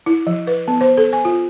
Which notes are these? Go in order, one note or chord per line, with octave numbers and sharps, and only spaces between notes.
E4
F3
B4
B3
C5
A4
G#5
F4